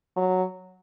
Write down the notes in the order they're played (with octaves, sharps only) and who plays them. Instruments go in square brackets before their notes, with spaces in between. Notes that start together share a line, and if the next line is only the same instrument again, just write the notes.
[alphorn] F#3